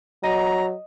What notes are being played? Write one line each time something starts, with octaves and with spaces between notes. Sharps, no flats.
F#3 D#5 A#5